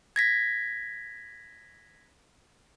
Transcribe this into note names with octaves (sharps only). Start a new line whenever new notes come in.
G#6 A#6 B6